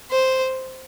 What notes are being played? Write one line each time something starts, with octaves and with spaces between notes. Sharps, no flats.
C5